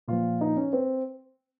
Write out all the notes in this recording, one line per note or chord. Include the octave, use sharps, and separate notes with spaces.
A#2 F3 F4
D#4
C#4
C4